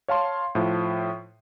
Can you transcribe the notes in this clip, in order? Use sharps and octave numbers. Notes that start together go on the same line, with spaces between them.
C#5 F5 A5 C6
A2 F3